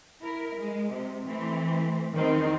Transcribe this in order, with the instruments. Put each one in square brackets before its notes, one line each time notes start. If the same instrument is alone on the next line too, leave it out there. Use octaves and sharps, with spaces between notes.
[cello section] E4 A#4
G#3
C3
E3 A3 C4
[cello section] E2 C4 D#4 [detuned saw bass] D#3